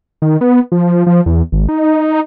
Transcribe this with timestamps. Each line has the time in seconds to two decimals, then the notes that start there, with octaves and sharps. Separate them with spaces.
0.22 D#3
0.41 B3
0.72 F3
1.06 F3
1.26 E2
1.52 G#1
1.69 D#4